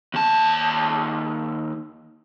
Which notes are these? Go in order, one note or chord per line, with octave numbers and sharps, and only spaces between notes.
D#2 A5